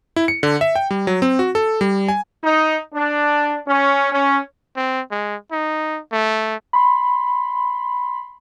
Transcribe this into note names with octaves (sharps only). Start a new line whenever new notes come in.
E4
C#7
D3
E5
G5
G3
F#3
C4
F#4
A4
G3
G#5
D#4
D4
C#4
C#4
C4
G#3
D#4
A3
B5 C6